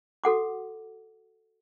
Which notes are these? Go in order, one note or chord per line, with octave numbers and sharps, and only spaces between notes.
F#4 A4 F#5 D6